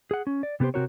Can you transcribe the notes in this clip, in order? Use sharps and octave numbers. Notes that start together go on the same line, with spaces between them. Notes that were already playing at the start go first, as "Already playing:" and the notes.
G#4 F#5
C#4
D5
C3 B3 F#4 G4 C5
C3 C4 F#4 A#4 C#5